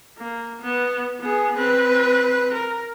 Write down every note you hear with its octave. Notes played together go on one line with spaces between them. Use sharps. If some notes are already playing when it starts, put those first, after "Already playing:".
A#3
B3
B3 G#4
C4 B4
A#4